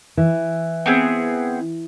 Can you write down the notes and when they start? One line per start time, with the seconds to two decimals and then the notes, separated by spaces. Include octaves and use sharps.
0.17 E3
0.86 B3 C4 G#4